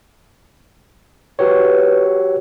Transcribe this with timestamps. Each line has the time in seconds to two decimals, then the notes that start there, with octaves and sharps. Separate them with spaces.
1.39 F#4 G4 B4 C#5